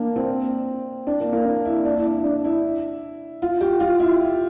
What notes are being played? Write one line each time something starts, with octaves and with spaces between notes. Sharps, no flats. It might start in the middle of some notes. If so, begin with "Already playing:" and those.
Already playing: A#3 D4
C4
D4
A#3
A#3
D4
E4
D4
E4
D4
D4
E4
F4
G4
F4
E4